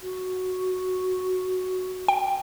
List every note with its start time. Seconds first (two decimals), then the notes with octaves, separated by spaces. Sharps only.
0.02 F#4
2.08 G5